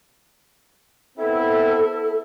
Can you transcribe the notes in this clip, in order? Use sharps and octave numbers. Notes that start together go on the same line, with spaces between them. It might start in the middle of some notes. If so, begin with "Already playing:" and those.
B3 C4 E4 A4